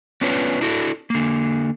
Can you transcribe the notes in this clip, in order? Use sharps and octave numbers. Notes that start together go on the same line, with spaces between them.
B3 C#4 D4 F4 B4 C#5
D4 E4 F#4 A4
D3 A#3